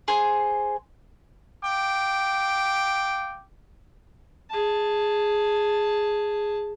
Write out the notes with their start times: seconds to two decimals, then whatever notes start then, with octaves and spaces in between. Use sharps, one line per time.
0.08 G#4 C5
1.64 F5 G5 D6
4.50 G#4 A5